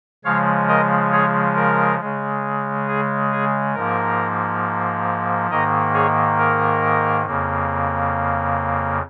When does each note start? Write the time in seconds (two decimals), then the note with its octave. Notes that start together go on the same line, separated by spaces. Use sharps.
0.25 C#3 F3 G#3 C#5 F5
0.68 A#4 D#5
1.12 G#4 C#5
1.55 A#4
2.00 C#3 G#3
2.88 G#4
3.32 G#4
3.75 G#2 F3 A#3 A#4
5.50 G#2 D#3 A#3 A#4 D#5
5.94 G#4 C#5
6.39 A#4
7.26 F2 C#3 A#3